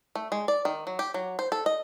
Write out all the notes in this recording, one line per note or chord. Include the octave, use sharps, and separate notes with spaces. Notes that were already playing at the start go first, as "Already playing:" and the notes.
A3
G#3
D5
D#3
F#3
G4
F#3
C5
A4
D#5